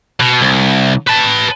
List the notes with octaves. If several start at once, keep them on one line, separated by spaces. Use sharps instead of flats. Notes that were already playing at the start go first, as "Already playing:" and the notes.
B2
C2
B4 A5